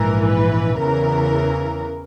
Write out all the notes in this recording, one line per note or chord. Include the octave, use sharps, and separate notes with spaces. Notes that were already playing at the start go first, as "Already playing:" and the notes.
Already playing: A#1 G#2 E3 A#4
B4
E2 C#3 E3 A#4